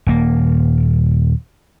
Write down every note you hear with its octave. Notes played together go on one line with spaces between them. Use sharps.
D#1 A#3